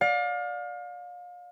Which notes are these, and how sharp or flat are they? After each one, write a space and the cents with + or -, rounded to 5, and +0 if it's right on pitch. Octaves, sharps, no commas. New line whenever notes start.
D5 +0 F5 +35